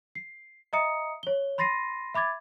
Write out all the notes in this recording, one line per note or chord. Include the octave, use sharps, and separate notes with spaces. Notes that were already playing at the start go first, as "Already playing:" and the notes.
C7
D#5 E5 A#5 D#6 C#7
C#5 G7
B5 C6 A6 A#6 C7 D#7
E5 B5 D6 G#6 A6